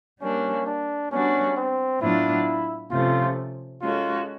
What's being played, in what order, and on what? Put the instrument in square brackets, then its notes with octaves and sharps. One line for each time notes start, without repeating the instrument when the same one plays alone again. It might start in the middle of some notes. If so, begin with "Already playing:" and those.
[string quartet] G3 A#3 D4 [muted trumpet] C#4
[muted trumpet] D4
[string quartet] G3 B3 D4 F#4 [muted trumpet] C#4
[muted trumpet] C4
[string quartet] A2 F#3 B3 D4 F4 [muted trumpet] E4
[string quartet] C3 F3 A3 C#4 [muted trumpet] F4
[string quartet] G#3 C#4 F#4 A4 [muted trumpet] F4